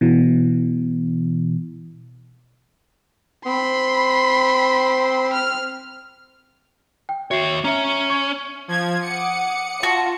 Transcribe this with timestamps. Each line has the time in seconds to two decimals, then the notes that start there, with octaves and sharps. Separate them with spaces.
0.01 B2 E3
3.46 C4 B5 C6
5.33 F6
7.09 G5
7.31 D#2 F#4 C#5 E5 C7
7.64 C#4 E5 A#5
8.10 C#6 G#6
8.68 F3 G#6
9.02 F#5 D6 D#6 C#7
9.83 F4 F#4 A5